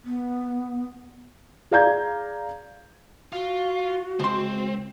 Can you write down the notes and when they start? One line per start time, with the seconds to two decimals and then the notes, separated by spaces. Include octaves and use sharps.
0.05 B3
1.71 G#4 D5 F5 A#5 G6 G#6
3.33 F4 F#4
4.20 C#2 C4 C6